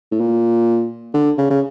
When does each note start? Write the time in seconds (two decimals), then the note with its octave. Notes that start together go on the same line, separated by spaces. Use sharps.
0.11 A2
0.20 A#2
1.14 D3
1.38 C#3
1.50 C#3